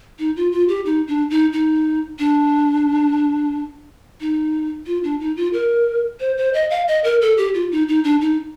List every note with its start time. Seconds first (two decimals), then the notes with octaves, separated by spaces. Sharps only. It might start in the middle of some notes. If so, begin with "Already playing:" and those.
0.19 D#4
0.36 F4
0.52 F4
0.69 G4
0.86 D#4
1.08 D4
1.30 D#4
1.53 D#4
2.19 D4
4.21 D#4
4.87 F4
5.04 D4
5.20 D#4
5.37 F4
5.53 A#4
6.20 C5
6.38 C5
6.54 D#5
6.71 F5
6.88 D#5
7.04 A#4
7.22 A4
7.38 G4
7.54 F4
7.72 D#4
7.88 D#4
8.04 D4
8.21 D#4